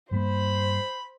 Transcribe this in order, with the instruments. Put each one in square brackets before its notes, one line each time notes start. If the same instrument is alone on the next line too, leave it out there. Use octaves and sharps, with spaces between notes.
[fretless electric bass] G2 G3 A#3 [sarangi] C5 [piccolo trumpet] B5